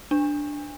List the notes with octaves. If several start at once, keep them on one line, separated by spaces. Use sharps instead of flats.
D4